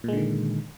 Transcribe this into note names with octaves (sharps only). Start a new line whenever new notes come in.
A#2 D3 D#3 G#3